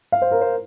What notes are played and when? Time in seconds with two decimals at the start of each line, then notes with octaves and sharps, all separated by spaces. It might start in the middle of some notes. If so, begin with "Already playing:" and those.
0.12 F5
0.22 C5
0.31 A#4
0.41 C5